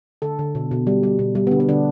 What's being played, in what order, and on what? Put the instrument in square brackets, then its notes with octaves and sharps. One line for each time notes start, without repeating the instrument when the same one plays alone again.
[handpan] D3 A4
D3
B2
B2
G3
G3
B2
G3
B3
D3 D4
B3
D3 D4